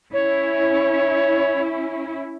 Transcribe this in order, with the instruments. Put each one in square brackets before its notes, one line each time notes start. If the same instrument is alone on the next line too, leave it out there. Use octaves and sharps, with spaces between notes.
[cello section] C#4 E4 [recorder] C#5